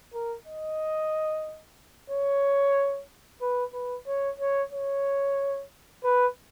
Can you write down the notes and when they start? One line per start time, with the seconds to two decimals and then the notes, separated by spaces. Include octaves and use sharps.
0.14 A#4
0.46 D#5
2.10 C#5
3.42 B4
3.73 B4
4.07 C#5
4.39 C#5
4.71 C#5
6.04 B4